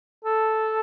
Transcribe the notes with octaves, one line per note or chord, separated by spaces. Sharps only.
A4